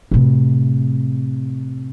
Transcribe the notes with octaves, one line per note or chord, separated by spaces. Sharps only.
A2 C3